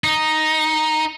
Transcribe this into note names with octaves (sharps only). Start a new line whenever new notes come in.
D#4